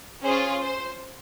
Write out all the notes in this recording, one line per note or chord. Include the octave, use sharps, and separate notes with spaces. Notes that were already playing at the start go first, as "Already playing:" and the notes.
C#4 F4 G#4 C5
C5